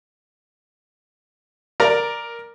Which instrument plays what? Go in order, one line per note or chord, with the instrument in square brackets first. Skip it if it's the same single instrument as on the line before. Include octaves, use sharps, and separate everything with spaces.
[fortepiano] A#4 D5 A#5